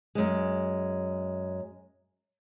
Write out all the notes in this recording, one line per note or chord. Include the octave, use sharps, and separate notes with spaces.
F#2 G#3